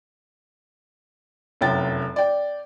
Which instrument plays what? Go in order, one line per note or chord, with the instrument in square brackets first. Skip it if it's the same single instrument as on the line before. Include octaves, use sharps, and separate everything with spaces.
[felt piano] F1 F#2 E4 G5 A6
D5 G5